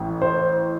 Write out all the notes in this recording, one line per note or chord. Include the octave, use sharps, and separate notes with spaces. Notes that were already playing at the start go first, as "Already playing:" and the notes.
Already playing: A1 A2
C5